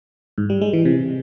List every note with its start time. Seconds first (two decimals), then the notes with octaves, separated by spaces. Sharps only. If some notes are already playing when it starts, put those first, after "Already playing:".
0.38 G#2
0.50 G3
0.61 G#3
0.73 E3
0.85 C3